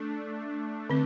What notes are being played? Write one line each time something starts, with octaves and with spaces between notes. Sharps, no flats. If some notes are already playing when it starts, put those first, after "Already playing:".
Already playing: A3 D4
D3 C4